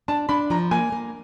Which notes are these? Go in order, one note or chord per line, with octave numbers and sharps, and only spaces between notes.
D4 A5
D4 B5
F3 A#5
A#3 G#5
A#3